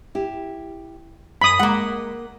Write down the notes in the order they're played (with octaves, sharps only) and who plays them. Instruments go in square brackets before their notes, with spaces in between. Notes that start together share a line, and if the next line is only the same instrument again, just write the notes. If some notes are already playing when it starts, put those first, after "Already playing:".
[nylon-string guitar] E4 G4
[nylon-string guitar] F#2 [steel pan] B5 D#6
[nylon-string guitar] G#3 [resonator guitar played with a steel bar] A#3 F#5